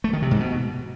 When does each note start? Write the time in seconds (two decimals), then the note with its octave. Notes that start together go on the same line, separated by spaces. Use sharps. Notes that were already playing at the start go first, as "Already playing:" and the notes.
0.04 A3
0.13 D#3
0.22 C3
0.31 G#2
0.40 B2